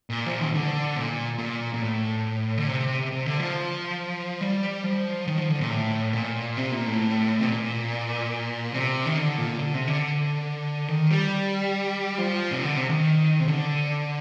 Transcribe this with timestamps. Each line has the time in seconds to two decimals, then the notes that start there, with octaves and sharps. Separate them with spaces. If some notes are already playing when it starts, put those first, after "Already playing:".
0.10 A#2
0.26 F3
0.40 D#3
0.53 D3
0.96 A#2
1.39 A#2
1.74 A#2
1.82 A2
2.57 D3
2.68 C3
3.12 C3
3.26 D3
3.40 F3
4.41 G3
4.84 F3
5.28 D#3
5.38 F3
5.49 D3
5.59 A#2
5.70 A2
6.13 A#2
6.57 C3
6.72 A#2
6.86 A2
7.40 C3
7.43 A#2
8.72 C3
9.06 D#3
9.17 D3
9.38 A#2
9.59 D3
9.74 C3
9.87 D3
10.88 D#3
11.10 G3
12.18 F3
12.52 C3
12.62 D3
12.77 C3
12.90 D#3
13.40 C3
13.48 D3